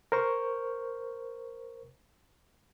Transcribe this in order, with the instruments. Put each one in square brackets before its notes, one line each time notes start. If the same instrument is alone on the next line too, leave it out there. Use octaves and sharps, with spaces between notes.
[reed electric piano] A#4 C5 C#6